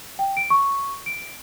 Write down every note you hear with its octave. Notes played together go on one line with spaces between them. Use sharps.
G5
D7
C#6
D7